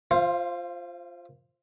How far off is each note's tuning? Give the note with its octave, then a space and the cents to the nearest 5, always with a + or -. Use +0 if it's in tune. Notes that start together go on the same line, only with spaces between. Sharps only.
F4 +0 C5 +10 F5 -45